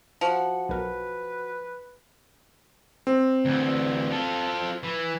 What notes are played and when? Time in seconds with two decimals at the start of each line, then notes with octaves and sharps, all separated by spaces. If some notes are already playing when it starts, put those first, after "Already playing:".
0.21 F3 F#4 F#5
0.69 B1 A#4 B4
3.07 C4
3.45 D2 E3
4.11 F4 A4
4.83 E3